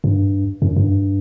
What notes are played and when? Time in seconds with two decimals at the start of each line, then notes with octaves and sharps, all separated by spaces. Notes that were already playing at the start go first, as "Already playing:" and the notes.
0.04 G2
0.62 F#2
0.76 G2